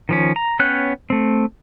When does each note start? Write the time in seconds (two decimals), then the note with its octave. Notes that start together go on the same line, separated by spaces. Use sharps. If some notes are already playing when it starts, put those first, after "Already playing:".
0.09 D#3 F3 C#4
0.36 A#5
0.59 B3 C#4 C#5 G5 F#6
1.10 A3 C4